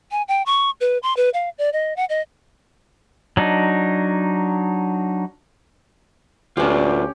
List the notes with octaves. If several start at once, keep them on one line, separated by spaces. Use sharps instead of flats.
G#5
G5
C#6
B4
C6
B4
F5
D5
D#5
F#5
D#5
F#3 D4 D#4
D2 C#4 F4 G4 B4 D5